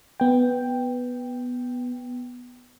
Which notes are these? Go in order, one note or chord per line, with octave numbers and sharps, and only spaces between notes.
B3 G5